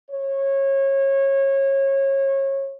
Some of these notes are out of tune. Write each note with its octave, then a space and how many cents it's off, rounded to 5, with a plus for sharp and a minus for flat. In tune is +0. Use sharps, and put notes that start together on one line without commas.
C#5 -25